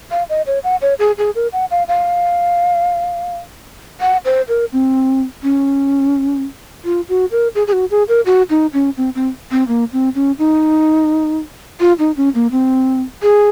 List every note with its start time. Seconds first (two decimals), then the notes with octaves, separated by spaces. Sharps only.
0.11 F5
0.29 D#5
0.47 C#5
0.64 F#5
0.82 C#5
0.99 G#4
1.18 G#4
1.35 A#4
1.53 F#5
1.71 F5
1.88 F5
4.01 F#5
4.25 C5
4.48 A#4
4.73 C4
5.43 C#4
6.85 F4
7.09 F#4
7.31 A#4
7.55 G#4
7.67 G#4
7.73 F#4
7.91 G#4
8.08 A#4
8.26 F#4
8.50 D#4
8.73 C#4
8.97 C4
9.15 C4
9.51 C4
9.68 A#3
9.93 C4
10.15 C#4
10.39 D#4
11.80 F4
11.99 D#4
12.17 C#4
12.35 A#3
12.51 C4
13.23 G#4